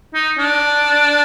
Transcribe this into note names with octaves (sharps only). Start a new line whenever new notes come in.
D#4
D4